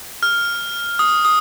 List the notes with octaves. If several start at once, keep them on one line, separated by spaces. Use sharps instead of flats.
F6
D#6
D#6